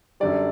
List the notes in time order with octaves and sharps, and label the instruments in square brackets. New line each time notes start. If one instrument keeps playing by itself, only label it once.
[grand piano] F#2 D3 G3 D5